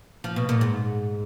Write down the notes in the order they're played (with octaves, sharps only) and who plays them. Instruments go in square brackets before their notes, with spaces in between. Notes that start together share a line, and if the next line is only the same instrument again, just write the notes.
[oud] F3
B2
A#2
G#2